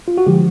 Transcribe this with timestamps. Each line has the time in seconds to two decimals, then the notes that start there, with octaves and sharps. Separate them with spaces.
0.08 F4
0.18 F#4
0.26 D3 F3 G#3 G4